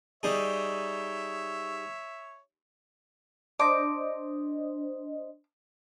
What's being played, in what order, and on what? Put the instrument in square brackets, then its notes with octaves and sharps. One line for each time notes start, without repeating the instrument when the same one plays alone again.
[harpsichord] G3 D#4 G#4 [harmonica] C#5 E5
[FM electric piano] D4 C5 D#5 [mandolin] D6